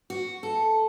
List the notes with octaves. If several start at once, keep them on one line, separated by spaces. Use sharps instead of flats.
F#4
A4